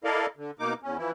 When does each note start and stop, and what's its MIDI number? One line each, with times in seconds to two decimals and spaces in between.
0.04 0.26 64
0.04 0.26 69
0.04 0.26 70
0.04 0.26 74
0.04 0.26 75
0.04 0.26 77
0.37 0.51 50
0.59 0.74 47
0.59 0.74 58
0.59 0.74 63
0.59 0.74 86
0.83 0.97 40
0.83 0.97 61
0.97 1.11 52
0.97 1.11 53
0.97 1.11 64